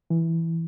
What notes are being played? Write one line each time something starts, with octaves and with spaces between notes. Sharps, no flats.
E3